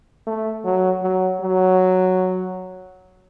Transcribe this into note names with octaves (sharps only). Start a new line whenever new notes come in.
A3
F#3
F#3
F#3